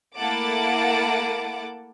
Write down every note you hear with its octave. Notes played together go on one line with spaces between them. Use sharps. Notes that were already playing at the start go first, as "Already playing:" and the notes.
A3 A#3 E4 F#5 A5 D6